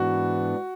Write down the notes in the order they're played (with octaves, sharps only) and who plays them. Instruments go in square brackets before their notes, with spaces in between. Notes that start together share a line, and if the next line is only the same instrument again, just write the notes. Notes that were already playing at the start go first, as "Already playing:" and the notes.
Already playing: [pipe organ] G#2 E3 B3 D4 [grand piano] F#4